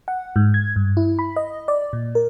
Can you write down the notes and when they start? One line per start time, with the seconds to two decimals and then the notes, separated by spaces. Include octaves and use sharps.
0.08 F#5
0.36 G#2
0.54 G#6
0.76 G2
0.97 E4
1.19 B5
1.36 D#5
1.68 D5
1.93 A#2
2.15 A#4